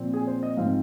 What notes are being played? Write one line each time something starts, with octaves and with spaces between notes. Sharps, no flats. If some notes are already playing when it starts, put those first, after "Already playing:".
Already playing: A#2 F3 C4
G#4
C5
D#5
G#2 F3 C4 F5